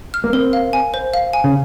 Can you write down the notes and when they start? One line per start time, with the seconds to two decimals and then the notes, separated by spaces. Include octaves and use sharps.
0.14 F6
0.24 A#3
0.33 C4 A#4
0.53 F5
0.73 G#5
0.94 C5
1.14 F5
1.33 G#5
1.44 C#3